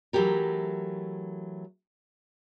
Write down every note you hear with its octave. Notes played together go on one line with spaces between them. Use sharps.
E3 F#3 G#3 A3 G4 A#4